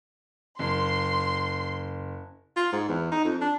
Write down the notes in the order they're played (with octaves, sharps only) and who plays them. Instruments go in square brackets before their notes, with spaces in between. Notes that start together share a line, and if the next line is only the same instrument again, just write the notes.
[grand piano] F#1 [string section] C6
[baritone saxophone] F4
G#2
E2
D#4
F2
D4